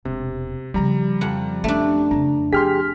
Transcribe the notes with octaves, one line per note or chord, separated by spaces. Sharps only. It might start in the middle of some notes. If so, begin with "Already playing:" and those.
E1 C3
C#3 F3 G3 A#5
F2 F#5
A3 C#4 D4 E4
F2 C#3 A#5
F3 G4 G#4 C6 F6 B6